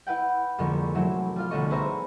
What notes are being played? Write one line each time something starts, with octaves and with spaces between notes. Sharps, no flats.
E4 B4 F#5 G5
C2 F2 D3 G#3 A#3 C#6
E3 F#3 A3 C4 E4
G3 F4 F5
B1 D3 A3 A4 D#5 C#6
G#4 B4 C5 E5 A#5 C#6